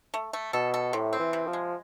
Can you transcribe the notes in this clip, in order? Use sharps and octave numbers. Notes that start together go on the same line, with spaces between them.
A3
A3
B2 A4
A4
A2 C3
C4
E3
C3
F3
G#3